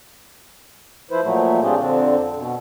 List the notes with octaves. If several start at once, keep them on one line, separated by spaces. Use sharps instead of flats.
F3 E4 B4 C5
A#2 F3 F#3 A3
C4 D4 F4 G4 G#4
F2 D3 C4 D4
B2